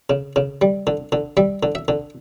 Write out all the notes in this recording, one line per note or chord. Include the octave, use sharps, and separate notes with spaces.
C#3
C#3
G3
D3
D3
G3 E5
D3
E5
D3